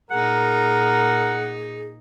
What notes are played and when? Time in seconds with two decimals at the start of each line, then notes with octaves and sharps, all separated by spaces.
0.11 A#2 D#4 G#4 A#4 F#5